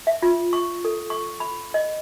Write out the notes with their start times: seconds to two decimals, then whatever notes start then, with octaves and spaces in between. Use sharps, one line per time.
0.07 E5
0.22 F4
0.53 C#6
0.85 A4
1.10 C#6
1.40 B5
1.74 D#5